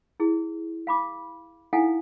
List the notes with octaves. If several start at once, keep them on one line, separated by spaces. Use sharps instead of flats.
E4 G#4
F5 B5 D6
D#4 E4 A4 F5 F#5 G#5